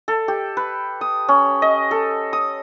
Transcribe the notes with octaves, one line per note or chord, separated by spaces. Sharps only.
A4
G4
B4
D#6
C#4
D#5
A4
D#6